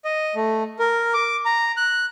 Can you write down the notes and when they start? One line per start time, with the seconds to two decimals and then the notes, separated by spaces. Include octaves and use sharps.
0.05 D#5
0.35 A3
0.79 A#4
1.14 D6
1.46 A#5
1.77 F#6